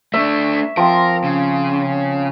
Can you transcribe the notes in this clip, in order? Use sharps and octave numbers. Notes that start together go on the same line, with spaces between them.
A3 D4 E5 C#6
F3 C4 A#4 C6
C#3